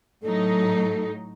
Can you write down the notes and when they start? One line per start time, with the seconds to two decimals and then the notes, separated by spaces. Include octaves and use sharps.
0.22 A2 F#3 D#4 A4